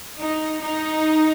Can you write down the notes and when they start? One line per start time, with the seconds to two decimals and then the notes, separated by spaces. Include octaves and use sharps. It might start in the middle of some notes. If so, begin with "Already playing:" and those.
0.19 D#4
0.61 D#4